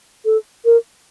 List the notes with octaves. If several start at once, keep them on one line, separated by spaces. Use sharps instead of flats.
A4
A#4